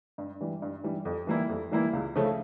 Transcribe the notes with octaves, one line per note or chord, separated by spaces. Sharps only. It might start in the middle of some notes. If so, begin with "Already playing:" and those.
G2
E3 G3
G2
E3 G3
F2
E3 G3 A#3 E4
F2
E3 G3 A#3 E4
C#2
C#3 F3 A3 C#4